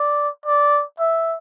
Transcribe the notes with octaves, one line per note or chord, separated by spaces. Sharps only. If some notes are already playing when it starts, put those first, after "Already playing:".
Already playing: D5
D5
E5